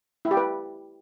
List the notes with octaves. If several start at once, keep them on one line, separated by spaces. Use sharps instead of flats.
E4
G4
B4